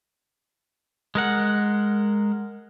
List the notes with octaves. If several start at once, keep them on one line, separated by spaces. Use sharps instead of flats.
G#3 A#4 F#5